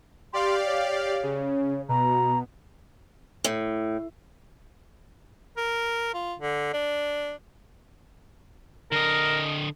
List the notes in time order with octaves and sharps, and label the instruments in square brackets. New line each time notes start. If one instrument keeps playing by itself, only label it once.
[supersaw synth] G4 D5 F5 [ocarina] C6
[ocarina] C#5
[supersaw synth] C#3
[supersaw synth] B2 [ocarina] A#5
[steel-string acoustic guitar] A2
[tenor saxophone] A#4
F4
D3
D4
[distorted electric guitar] D3 D#5 [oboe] A#4